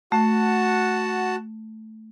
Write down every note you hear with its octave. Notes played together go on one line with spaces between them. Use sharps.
A3 F#4 F#5 A5